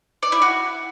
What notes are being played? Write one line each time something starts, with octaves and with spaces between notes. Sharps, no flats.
D5
E4
F#4